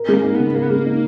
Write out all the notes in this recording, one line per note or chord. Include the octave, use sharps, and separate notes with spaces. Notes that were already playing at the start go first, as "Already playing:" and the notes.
Already playing: A#4
G#3
A#3
D#4
C#3 B3
A#3 A#4
B3
G#3 A#3
D#4